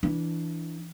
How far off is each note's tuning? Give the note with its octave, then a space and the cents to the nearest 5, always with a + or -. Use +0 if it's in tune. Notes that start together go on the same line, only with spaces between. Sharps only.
E3 +0 D4 +0